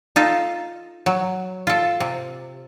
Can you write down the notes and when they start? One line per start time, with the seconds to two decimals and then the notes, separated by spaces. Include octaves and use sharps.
0.16 D#4 F4 A4
1.06 F#3
1.67 F4 A4
2.00 C3